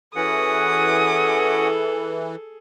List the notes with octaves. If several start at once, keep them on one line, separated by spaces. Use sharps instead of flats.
E3 C#4 F#4 G#4 A4 F#5 D#6